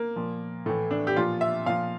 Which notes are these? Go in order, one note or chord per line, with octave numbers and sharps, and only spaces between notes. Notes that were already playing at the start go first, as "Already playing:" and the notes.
Already playing: A#3
A#2 F3
A2 E3 A3
D4
G4
A#2 F3 F4
E5
A#2 F3 F5